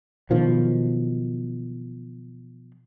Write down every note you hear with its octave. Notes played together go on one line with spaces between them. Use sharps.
B2 D#3 F3 F#3